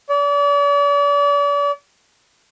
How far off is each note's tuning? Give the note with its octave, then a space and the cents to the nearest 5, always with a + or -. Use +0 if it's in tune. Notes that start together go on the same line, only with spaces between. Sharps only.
D5 -40